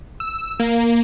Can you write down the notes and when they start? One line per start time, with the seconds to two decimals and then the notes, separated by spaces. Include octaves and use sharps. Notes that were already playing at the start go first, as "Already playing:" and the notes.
0.20 E6
0.60 A#3